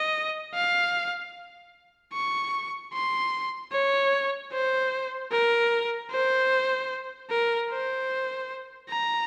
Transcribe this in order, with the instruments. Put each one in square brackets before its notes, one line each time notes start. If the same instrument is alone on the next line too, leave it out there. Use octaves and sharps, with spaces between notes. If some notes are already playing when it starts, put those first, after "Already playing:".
Already playing: [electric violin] D#5
F5
C#6
C6
C#5
C5
A#4
C5
A#4
C5
A#5